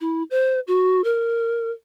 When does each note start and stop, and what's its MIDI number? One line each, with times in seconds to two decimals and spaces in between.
0.01 0.23 64
0.31 0.60 72
0.67 1.04 66
1.04 1.71 70